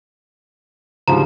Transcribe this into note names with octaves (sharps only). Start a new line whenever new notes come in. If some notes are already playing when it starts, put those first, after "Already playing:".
D2 G#2 F3 G3 A#5